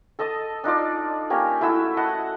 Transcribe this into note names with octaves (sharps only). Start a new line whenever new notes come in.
A4 D#5 A5 D#6
D4 D#4 F4 D5
A#3 C#4 G4
A3 E4 F#4 E6
D#5 F#5 A5